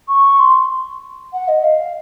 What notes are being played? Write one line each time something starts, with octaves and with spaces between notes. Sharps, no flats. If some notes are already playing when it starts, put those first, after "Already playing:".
C#6
C6
F#5
D#5
F5